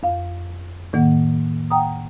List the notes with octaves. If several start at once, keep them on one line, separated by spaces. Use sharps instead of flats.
F2 F5
A2 D#3 A#3 F#5
F#5 G5 A#5 D#6